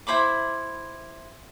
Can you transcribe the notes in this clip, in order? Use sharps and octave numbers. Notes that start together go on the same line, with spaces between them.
E4 C5 B5 D6